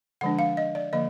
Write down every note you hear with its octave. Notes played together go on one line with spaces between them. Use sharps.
D3 F3 G#3 D4 F#5
F5
D#5
D5
D3 F3 A#3 D#5